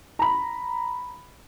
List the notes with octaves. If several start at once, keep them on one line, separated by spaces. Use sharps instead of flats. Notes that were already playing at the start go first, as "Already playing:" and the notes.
A#5 B5